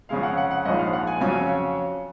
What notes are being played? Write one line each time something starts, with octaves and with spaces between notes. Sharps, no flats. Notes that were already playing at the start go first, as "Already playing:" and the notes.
F2 C#3 G#3 F5
F#5
F#5
F#5
A#1 G#2 F3 D#5
F5
F#5
G#5
F2 C#3 F#3 C#4 G#5